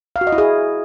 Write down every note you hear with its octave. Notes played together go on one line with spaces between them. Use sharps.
F5
F#4
D#5
E4
G#4